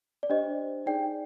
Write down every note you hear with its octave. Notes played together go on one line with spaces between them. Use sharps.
D5
D4 G4 C5 D#5
D#4 G#4 D5 G5